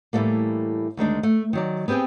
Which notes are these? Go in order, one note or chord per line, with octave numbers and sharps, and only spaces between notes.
A2 E3 F#3 G3 A3 A#3
D2 D#3 G#3 D4
A3
D#3 F#3 D5
B3 C4 G4 G#4 G5